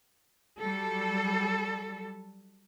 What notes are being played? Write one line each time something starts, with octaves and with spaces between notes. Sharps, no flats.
F#3 G3 A4